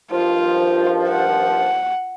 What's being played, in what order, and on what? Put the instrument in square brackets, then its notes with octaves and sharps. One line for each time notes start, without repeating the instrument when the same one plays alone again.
[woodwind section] G2 D#3 F3 [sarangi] F4
[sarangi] F#5